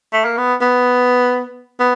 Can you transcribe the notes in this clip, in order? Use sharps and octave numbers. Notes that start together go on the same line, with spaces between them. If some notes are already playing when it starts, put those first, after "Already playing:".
A3
A#3
B3
B3
B3